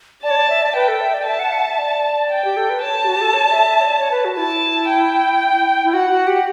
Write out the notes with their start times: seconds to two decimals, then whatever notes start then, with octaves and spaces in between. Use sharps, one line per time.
0.23 D5 A5
0.31 C#5
0.36 D5
0.50 E5
0.62 D5
0.75 B4 G5
0.88 A4
1.01 E5
1.14 D5
1.27 E5 A5
1.39 F#5
1.53 E5
1.59 F#5
1.66 E5
1.79 D5
2.30 G5
2.45 G4
2.57 A4
2.70 B4
2.82 C#5 A5
3.04 G4
3.08 F#4
3.16 G4
3.21 A4
3.34 C#5
3.45 D5
3.51 E5
3.69 E5
3.81 C#5
3.86 D5
3.99 C#5
4.11 B4
4.25 F#4
4.37 E4 A5
4.90 G5
5.84 E4
5.93 F#4 F#5
6.10 F#4
6.27 G4